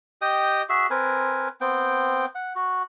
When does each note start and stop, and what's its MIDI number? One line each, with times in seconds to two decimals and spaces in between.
0.22 0.62 67
0.22 0.62 75
0.22 0.62 79
0.22 0.62 87
0.69 0.87 66
0.69 0.87 68
0.69 0.87 76
0.90 1.48 60
0.90 1.48 70
0.90 1.48 71
0.90 1.48 80
1.61 2.25 59
1.61 2.25 60
1.61 2.25 79
2.35 2.53 78
2.56 2.82 66